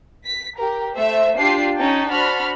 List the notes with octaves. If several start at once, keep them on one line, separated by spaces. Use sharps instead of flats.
B6
G4 A#4
A3 C5 E5
D4 F4 G4 C7
C#4 D#4 G5 A5
D4 F#4 C5 A5 B5 F6